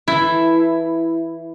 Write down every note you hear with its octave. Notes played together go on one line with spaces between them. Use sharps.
E3 E4 A4